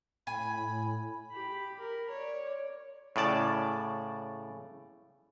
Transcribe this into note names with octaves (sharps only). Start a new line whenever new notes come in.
A2 G#5 B5
G4 B5
A#4
C#5 D5
A2 C#3 D5 A5